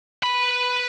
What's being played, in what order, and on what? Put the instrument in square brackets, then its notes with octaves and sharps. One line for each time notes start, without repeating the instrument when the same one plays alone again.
[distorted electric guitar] B4 B5